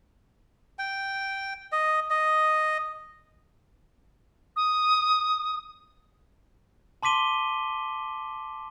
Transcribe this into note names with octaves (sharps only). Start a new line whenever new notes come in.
G5
D#5
D#5
D#6
A5 C6 D6 B6 D#7 G7